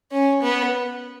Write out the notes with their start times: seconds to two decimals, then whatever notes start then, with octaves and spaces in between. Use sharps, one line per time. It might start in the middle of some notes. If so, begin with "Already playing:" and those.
0.12 C#4
0.42 B3